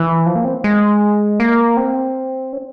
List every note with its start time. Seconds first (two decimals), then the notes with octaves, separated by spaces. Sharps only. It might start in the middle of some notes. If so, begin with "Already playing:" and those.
Already playing: E3
0.26 F3
0.36 A#3
0.45 C4
0.64 G#3
1.40 A#3
1.77 C4
2.53 C#4